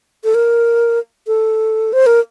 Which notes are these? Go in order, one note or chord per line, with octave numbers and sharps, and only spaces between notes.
A4
A#4
A4
C5
A#4